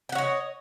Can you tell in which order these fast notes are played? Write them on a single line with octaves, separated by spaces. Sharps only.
G5 F#5 C#5 D#5